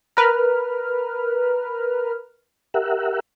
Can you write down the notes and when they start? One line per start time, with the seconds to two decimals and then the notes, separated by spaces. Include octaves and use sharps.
0.17 A#4 B4 F6
2.74 G4 A#4 E5 F#5